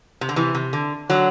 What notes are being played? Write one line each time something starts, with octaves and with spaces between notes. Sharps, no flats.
C3
D3
C3 E3
C3
D3
D3 F#3